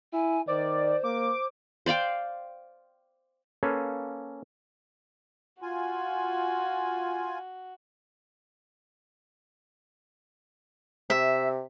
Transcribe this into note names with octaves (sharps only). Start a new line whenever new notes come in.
E4 G#5
D#3 C5 D5
A#3 D6
C5 D5 F5 G5
A#3 C#4 A4 B4 F5 G#5
F4 F#4 G#5
C3 E5